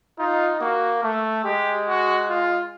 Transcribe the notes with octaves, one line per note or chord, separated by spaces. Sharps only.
D#4 F4
A#3 F#4
A3
G#3 G4
F#4
F4